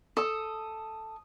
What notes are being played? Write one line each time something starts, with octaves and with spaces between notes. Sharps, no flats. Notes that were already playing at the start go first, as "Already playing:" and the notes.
A4 D#6